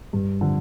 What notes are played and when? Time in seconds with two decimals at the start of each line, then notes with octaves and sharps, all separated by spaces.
0.13 G2
0.41 D3 F3